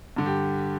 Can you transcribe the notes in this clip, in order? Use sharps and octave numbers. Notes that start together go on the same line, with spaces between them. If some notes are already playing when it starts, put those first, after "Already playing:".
G2 D3
G4